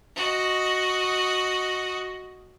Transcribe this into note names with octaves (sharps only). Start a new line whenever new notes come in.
F#4 D#5